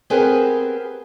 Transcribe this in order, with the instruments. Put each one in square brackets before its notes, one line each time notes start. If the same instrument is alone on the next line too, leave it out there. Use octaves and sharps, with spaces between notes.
[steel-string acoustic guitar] B3 C4 G4 G#4 A#4 B4